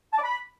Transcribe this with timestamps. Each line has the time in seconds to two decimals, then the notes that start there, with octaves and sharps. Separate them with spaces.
0.13 A5
0.18 D5
0.23 B5